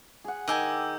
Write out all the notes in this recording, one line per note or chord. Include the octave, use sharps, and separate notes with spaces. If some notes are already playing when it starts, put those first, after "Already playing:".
G#4 F#5
D#3 D#5 G5 G#5 D6 E6 G6